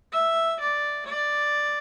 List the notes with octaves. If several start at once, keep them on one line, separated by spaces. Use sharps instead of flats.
E5
D5
D5